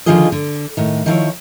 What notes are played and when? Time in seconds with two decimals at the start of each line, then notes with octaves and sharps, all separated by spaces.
0.06 D3 D#3 F3 F4 G#4 D#5
0.32 D3
0.77 A2 D#3
1.06 D#3 F3 E4 C#5